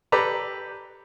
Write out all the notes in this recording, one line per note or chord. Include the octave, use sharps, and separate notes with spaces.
G4 A4 B4 D5 A#5